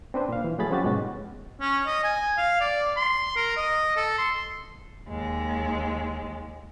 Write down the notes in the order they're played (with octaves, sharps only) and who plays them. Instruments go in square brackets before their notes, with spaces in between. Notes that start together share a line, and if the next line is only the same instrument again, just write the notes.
[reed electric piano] C4 D4 B4 C5
A#2 F5
E3
F#3 A3 G#4 B5 A6
F3 C4 C#4 F#4 G4 A6
G#2 B2 G#3 B3 C#4 F#4
[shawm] C#4
D#5
G#5
F5
D5
C6
A#4
D#5
A4
C6
[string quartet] D#2 G#3